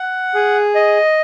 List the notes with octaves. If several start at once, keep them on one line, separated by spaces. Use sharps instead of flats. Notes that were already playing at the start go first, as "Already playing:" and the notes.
Already playing: F#5
G#4
D#5